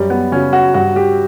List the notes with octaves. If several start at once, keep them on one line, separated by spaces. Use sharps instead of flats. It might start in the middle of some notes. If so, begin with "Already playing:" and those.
Already playing: F#2 G3
B3
C#3 F#3 C#4
F#4
G2 F#4
G4